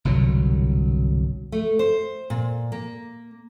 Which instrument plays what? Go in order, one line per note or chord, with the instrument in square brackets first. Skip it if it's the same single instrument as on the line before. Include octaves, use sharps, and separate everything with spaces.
[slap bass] G1 C2 B2 F#3
[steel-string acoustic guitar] A3
C5
A#2
A#3